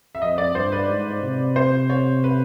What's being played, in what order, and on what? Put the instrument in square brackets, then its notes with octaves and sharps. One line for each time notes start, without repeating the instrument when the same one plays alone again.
[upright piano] E5
[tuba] F2 [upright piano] D#5
[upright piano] D5
[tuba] G2 [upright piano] C5
[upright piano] B4
[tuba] G#2
C3
[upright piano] C5
C#5
B4